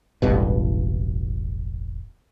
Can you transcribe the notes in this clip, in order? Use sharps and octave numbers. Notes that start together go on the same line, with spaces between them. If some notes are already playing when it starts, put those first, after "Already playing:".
E1 A1 G2 B2